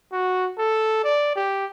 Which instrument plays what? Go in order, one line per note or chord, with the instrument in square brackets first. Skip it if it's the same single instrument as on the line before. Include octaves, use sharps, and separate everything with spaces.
[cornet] F#4
A4
D5
G4